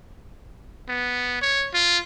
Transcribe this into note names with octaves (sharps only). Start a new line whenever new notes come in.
B3
C#5
F4